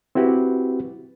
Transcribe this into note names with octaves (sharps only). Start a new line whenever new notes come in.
C4 E4 F#4 G4 B4